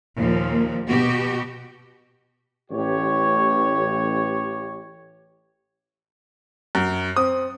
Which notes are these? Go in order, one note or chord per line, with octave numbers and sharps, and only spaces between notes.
D#2 A#2 F3
B2 B3 F#4 G4
A1 G4 C#5
F#2
C4 D#6